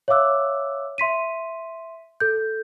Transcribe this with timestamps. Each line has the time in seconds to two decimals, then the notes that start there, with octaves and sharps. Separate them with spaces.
0.08 C#5 E5 F5 D6 E6 F#6
0.98 E5 C6 B6 D#7
2.20 A4 G6